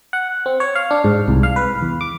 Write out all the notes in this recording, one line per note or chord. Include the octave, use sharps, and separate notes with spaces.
F#5
C4
C#5
F5
D4
G#2
C2
F5
B4
E2
D6